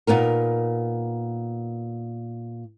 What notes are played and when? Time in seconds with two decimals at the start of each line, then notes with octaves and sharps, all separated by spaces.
0.07 A#2 B3 D#4 A#4